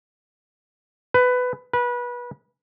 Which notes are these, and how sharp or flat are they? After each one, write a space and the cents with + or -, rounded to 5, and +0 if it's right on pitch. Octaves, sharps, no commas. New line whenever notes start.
B4 +15
B4 -25